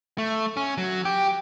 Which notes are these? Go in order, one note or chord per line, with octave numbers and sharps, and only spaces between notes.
A3
C#4
F#3
G4